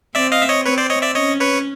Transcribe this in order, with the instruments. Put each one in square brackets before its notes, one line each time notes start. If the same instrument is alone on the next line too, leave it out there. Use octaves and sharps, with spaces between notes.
[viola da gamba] C4 [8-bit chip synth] D5 E5
[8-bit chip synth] D#5 F5
E5
C#5 D#5
[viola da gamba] C4 [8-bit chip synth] B4 C#5
[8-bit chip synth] C5 D5
C#5 D#5
D5 E5
[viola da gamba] C#4 [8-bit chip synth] C#5 D#5
[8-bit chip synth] B4 C#5